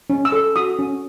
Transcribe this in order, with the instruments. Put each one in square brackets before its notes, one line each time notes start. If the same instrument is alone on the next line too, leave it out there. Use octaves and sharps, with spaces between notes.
[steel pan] C#4
E6
A4
F#4 D#6
C#4